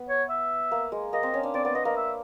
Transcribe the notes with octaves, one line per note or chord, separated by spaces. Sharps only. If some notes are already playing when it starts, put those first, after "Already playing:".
Already playing: B3
C#5
E5
A#3
G#3
A#3 D#5
C4
C#4
D4
C4 D5
B3 D5
B3 D#5
A#3 D#5
E5